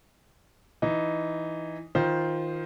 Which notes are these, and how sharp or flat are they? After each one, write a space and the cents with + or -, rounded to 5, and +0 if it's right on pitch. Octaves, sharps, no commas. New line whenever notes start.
E3 +0 D#4 +0
D#3 +20 F4 +0 C5 +0